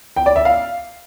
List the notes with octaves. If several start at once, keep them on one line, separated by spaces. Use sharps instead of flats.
G5
D5
E5
F5